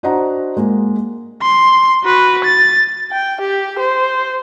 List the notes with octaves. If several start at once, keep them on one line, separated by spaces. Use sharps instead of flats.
D4 F#4 C5 D#5 F#5 A#5
G#3 A#3
C6
F#4 B4
A6
G5
G4
C5